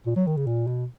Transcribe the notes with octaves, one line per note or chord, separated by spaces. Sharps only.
A#2
F#3
D#3
C#3
A#2
B2